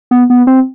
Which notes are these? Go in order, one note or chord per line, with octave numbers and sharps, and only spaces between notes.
B3
B3
C4